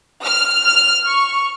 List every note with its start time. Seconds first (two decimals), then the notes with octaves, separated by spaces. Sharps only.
0.23 F6
0.63 F6
1.06 C#6